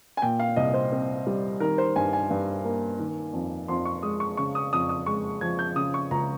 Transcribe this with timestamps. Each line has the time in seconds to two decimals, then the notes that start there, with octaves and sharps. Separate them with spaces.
0.17 G#5
0.22 A#2 G5
0.40 F5
0.56 C2 D#5
0.74 C5
0.92 C4
1.27 G3
1.60 D#3 A#4
1.78 C5
1.96 G2 G#5
2.13 G#5
2.30 G2
2.65 A#3
2.99 D#3
3.33 F2
3.68 F2 C6
3.85 C#6
4.03 G#3 D#6
4.20 C#6
4.37 C#3 C#6
4.55 D#6
4.73 F2 D#6
4.89 D#6
5.06 G#3 C#6
5.41 F3 G#6
5.59 G6
5.76 C#3 D#6
5.94 C#6
6.11 C#2 A#5